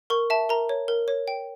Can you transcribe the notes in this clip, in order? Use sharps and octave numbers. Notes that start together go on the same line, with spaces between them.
A#4 C#6
E5 A5
A#4 A#5
C#5
A#4
C#5
G5